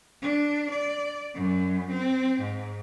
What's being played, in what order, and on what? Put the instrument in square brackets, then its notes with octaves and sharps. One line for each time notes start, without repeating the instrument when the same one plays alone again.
[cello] D4
D5
F#2
C4
G#2